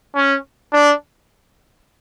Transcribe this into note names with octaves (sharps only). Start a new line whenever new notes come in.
C#4
D4